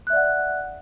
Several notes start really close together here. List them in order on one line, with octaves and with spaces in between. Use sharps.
F#6 E5 D5 F#5